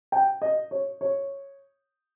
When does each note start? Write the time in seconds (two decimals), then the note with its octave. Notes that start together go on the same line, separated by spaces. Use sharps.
0.12 G5
0.42 D#5
0.71 C#5
1.01 C#5